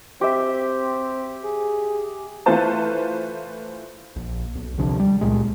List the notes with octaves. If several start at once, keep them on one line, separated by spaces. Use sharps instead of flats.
C4 G4 E5
G#4
E3 A3 F4 B4 C5 A5
A#1
B1
D2 C3 F3 D4
G3
C#2 A#2 G#3